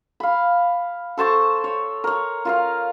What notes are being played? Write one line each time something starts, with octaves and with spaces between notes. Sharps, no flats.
F5 B5
A4 C5 A5 C#6
C#5
A#4 C#5
F4 A#4 F5